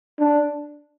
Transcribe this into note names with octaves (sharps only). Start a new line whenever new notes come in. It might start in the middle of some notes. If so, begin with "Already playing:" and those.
D4